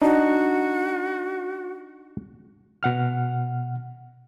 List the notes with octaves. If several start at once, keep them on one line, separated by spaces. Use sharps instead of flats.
D4 D#4 F#4
B2 F#5 F6